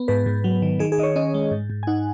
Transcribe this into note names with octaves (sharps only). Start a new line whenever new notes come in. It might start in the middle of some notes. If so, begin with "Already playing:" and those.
Already playing: B3
G#2 B4
G#2
F#3
D#3
D#3 G#4
G#4
D#3 D#5
C#5
C#4 D#5
G#3
G#2
G#2
G#5
D#4 F#5